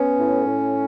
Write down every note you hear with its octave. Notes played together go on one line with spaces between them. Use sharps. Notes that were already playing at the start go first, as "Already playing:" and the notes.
Already playing: B3 C#4
A2
A2